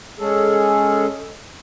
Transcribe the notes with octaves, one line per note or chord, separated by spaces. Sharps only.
G#3 C#4 G#4 A4